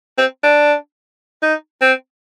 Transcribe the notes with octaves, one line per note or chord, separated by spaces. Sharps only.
C4
D4
D#4
C4